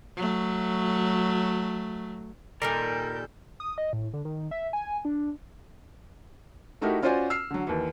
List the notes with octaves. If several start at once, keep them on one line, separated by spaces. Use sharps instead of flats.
F#3 A3
A#2 D#3 G3 A4 A#4 D5 G6
D#6
D#5
A2
D3
D#3
E5
G#5
D4
A3 D#4 E4 F#4 G4 A#4
C#4 F4 F#4 C5 D5 G#5
E6 F6 C7
D3 F#3
D#2 E3